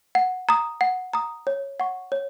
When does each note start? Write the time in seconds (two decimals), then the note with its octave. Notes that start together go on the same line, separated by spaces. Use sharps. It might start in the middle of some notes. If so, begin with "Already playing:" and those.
0.15 F#5
0.49 A#5 D#6
0.81 F#5
1.13 A#5 D#6
1.47 C#5
1.80 F#5 C#6
2.12 C#5